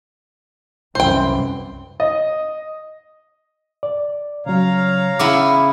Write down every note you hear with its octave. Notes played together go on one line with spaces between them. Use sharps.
C2 F#2 E3 C5 G5
D#5
D5
C#3 F#3 C#5 F5 A#5
C#3 B3 E4 D6